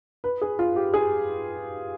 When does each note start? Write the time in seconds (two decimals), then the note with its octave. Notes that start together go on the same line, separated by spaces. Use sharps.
0.24 B4
0.42 G#4
0.59 F4
0.76 G4
0.94 G#4